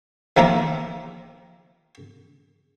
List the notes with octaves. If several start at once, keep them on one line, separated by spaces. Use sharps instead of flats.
D#3 F3 A#3 E4 F4 D6